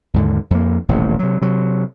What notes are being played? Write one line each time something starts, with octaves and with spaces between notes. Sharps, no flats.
D#2 G#2 D3
F2 A#3
D#1 A1 A2 C3
C3 F#3
C3 F#3